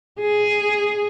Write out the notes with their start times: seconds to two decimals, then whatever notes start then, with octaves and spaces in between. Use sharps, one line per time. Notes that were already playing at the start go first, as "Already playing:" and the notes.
0.20 G#4